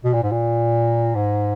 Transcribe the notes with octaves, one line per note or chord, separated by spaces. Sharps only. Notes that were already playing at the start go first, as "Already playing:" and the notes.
B2
A#2
G#2
A#2
G#2